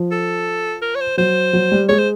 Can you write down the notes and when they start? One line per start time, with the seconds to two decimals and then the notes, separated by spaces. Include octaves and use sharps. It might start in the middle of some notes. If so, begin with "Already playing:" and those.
Already playing: F3
0.12 A4
0.82 A#4
0.95 C#5
1.01 C5
1.17 F#3 C5
1.53 F#3
1.72 G3
1.89 G#3 C#5
1.99 C5